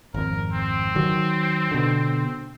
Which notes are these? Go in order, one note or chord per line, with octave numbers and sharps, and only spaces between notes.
G#1 F2 A#4
C4
D#3 F#3
B2 D3